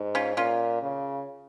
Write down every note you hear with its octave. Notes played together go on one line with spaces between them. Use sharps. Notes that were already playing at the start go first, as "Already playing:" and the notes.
Already playing: G#2
C#4 F4
A#2 C#4 F4
C#3